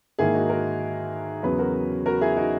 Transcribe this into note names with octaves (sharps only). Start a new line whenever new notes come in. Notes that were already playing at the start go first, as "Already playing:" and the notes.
G#2 D#3 A#3 E4 G#4
D#4 F#4
F#4 A#4
E2 C#3 F#3 B3 G#4 B4
F#4 A#4
F#4 A#4
E4 G#4
D#4 F#4